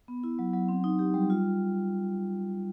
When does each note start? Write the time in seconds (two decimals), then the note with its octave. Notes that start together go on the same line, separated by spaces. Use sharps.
0.08 B3
0.24 E4
0.39 F#3
0.54 F#3
0.69 C4
0.84 D#4
0.99 G4
1.14 G3
1.30 F4